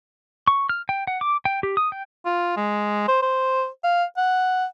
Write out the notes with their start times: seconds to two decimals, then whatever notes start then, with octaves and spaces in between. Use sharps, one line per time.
0.47 C#6
0.69 F6
0.89 G5
1.07 F#5
1.21 D6
1.45 G5
1.63 G4
1.77 D#6
1.92 G5
2.25 F4
2.57 G#3
3.08 C5
3.22 C5
3.84 F5
4.17 F#5